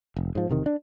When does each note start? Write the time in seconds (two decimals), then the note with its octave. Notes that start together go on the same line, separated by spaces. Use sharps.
0.17 F1
0.35 G#2 F3
0.49 E1 C3 D#3
0.66 D4